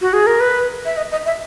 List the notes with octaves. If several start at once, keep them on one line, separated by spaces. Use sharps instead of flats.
F#4
G#4
A#4
B4
E5
D#5
D#5
E5